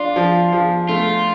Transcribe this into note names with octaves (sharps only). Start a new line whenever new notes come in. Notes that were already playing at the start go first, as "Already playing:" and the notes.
Already playing: D4 F4
F3
F3
A3 F4